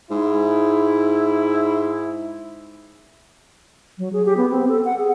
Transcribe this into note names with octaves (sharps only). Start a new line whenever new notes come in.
G#2 E4
F#3
G#4
G4
B3
C4
A4
F#5
G#4